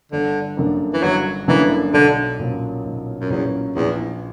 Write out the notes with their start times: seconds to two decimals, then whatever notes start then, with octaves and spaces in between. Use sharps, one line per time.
0.12 G1 D3
0.57 F#2 D3 A#3 D4
0.93 E3
1.03 G1 F#3
1.48 F#2 D3 E3 A#3 D4
1.93 B1 D3
2.39 A#2 F#3 C#4
2.85 B1
3.20 F#2
3.30 E2 A#2 F#3 C#4
3.76 A#1 E2